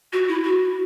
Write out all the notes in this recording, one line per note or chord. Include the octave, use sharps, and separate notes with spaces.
F#4
E4
F#4